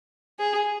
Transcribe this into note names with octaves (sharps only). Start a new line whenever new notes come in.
G#4